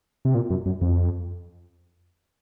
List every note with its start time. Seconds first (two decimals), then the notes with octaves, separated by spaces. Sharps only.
0.25 C3
0.35 A#2
0.50 F#2
0.66 F#2
0.81 F2